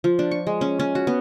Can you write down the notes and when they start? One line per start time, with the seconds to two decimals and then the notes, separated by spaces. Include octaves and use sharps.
0.04 F3
0.19 D4
0.31 C#6
0.47 G#3
0.61 C#4
0.80 C#4
0.95 F#4
1.07 B3